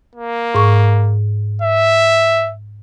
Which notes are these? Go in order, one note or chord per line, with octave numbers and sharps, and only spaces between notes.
A#3
G#2 C#6
E5